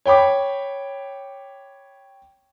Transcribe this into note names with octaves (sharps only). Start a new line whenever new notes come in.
C#5 G5 B5 D6